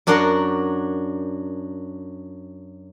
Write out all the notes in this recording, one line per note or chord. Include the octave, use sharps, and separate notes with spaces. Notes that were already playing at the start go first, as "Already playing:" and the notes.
F#2 D4 F#4 A#4 F#5 C6